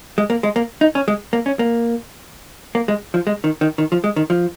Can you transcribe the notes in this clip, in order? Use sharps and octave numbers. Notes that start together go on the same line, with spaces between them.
G#3
A#3
G#3
A#3
D#4
C#4
G#3
A#3
C#4
A#3
A#3
G#3
F3
G#3
D#3
D#3
D#3
F3
G#3
D#3
F3